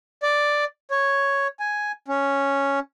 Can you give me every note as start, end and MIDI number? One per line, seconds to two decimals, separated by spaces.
0.23 0.64 74
0.91 1.47 73
1.60 1.92 80
2.08 2.79 61